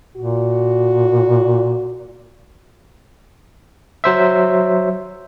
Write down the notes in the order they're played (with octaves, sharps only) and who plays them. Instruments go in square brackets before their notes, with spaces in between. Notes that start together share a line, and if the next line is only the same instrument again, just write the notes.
[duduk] A#2 [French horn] F#4
[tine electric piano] F#3 C5 E5